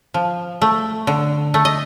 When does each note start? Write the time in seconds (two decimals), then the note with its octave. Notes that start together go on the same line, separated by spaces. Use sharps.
0.14 F3
0.62 A3
1.07 D3
1.54 A3
1.65 D#5